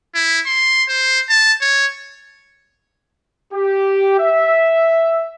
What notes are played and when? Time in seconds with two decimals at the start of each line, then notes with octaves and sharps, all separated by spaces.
0.15 E4
0.46 C6
0.89 C5
1.29 A5
1.61 C#5
3.53 G4
4.19 E5